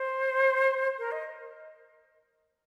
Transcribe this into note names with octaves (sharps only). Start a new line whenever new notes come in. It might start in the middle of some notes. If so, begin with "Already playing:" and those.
Already playing: C5
A#4
D#5